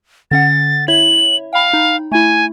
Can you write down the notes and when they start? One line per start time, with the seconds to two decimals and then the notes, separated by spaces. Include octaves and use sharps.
0.31 D3 C#4 F#5 A6
0.88 E4 C#5 E5 F#7
1.53 F5 G5 B5
1.73 D#4
2.12 A3 E4 G#5